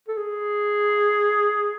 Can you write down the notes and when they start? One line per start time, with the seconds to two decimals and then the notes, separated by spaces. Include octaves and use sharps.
0.08 A4
0.17 G#4